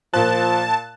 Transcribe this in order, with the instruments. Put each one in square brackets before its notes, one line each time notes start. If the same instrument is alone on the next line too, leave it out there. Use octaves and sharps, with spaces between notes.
[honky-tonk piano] A#2 F#6 [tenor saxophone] F3 [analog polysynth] A5